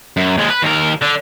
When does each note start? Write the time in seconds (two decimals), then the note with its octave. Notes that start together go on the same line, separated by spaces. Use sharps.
0.17 F#2
0.38 D#2 G#3
0.50 B4
0.63 D#2 A#4
1.02 D3